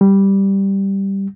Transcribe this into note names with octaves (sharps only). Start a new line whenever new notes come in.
G3